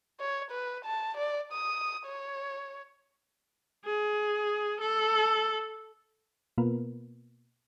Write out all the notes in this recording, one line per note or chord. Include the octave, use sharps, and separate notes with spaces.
C#5
B4
A5
D5
D#6
C#5
G#4
A4
B2 A#3 B3 F4 A#4 B4